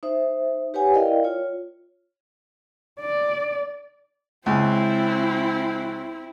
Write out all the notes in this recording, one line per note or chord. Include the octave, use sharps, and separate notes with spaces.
D#4 C5 E5
G4 B4 C#5 F#5 G#5
E4 A#4 D5 D#5 F5 G5
F4 C#5
D5
C#2 C4 E4